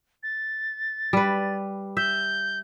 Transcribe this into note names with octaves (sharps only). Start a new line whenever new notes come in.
A6
G3 B4
E5 G6